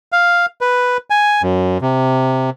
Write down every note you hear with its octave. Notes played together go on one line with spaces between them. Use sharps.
F5
B4
G#5
F#2
C3